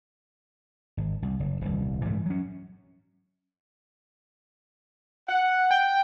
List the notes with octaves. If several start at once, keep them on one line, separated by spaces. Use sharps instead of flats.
G#1
C2
F#1
D#1 C2
G#2 E3 G#3 A3
F#3 C#4
F#5
G5